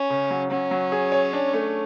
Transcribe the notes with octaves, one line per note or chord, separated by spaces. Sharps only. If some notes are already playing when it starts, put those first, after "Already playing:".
Already playing: C#4
C#3
F#3
F#3 C#4
F#3
G#4
C#5
D4
A3